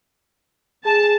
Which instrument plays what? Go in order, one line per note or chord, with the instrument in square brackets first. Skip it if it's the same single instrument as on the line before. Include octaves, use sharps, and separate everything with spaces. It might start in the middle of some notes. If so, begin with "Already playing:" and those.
[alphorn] G#4 [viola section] A5